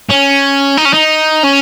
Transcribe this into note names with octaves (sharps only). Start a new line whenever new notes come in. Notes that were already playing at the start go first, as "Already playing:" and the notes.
C#4
D#4
C#4
D#4
C#4